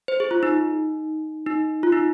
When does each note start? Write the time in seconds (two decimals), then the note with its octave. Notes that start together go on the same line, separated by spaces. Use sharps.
0.08 C5
0.20 G#4
0.31 F4
0.43 D#4
1.47 D#4
1.83 F4
1.92 D#4